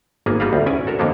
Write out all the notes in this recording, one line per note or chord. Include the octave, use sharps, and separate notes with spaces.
G#1 A#3 B3 G#4
G3 B3 F4 F#4 B4 F5
D2
C#4 E4 B4 D5 G#5
F#4 A4 A#4
F2 D3 A#3 B3 C5